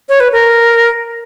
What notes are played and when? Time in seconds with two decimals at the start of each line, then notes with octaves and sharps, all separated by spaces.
0.09 C#5
0.20 B4
0.32 A#4